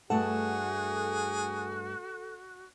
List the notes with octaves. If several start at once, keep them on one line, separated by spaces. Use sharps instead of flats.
G2 A3 F#4 G#4 A4 F#5